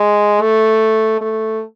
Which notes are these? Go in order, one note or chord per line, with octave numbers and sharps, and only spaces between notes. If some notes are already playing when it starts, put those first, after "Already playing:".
Already playing: G#3
A3
A3